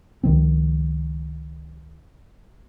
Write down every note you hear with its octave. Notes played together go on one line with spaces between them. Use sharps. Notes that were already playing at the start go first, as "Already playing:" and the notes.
C#2 D#3 F3 C4